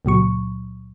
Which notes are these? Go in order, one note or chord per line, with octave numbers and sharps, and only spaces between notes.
C#2 A#2 F#3 C#6